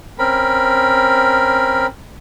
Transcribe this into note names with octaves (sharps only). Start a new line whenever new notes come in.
C4 C#4 A#4 B5